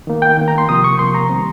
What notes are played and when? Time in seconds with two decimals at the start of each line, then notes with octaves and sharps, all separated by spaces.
0.07 D#3 A#3
0.22 G5
0.38 D#3 A#3
0.48 A#5
0.58 C6
0.68 C3 F3 A#3 D#6
0.84 C#6
0.99 C3 F3 A#3 C6
1.14 A#5
1.30 D#3 G3 C4